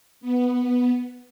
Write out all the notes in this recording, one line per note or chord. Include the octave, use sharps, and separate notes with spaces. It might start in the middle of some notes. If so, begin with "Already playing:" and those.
B3